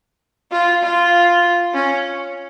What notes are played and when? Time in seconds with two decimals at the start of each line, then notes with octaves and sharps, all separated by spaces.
0.51 F4
0.83 F4
1.73 C#4